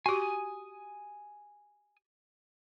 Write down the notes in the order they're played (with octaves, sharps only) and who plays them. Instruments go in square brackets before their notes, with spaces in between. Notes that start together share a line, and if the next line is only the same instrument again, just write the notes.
[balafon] F#4 G4 [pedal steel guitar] G#5 D#6